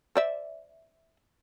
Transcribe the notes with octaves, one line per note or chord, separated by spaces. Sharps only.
C5 D5 E5